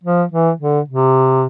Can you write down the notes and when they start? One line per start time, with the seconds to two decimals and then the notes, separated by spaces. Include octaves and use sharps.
0.04 F3
0.31 E3
0.60 D3
0.88 C3